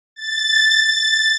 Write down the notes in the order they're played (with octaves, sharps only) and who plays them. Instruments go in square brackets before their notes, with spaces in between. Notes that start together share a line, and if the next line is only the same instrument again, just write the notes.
[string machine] A6